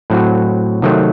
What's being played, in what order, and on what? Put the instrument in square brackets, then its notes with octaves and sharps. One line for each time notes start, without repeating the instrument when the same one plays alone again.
[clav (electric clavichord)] A2 F#3 C4 F#4
C3 D#3 F#3 A3 C4